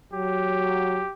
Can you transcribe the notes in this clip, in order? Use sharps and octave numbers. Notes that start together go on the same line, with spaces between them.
F#3 G4